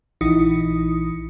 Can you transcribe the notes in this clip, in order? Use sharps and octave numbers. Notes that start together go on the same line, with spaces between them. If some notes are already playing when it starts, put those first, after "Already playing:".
A#1 E3 D#4 E4 D#6 C#7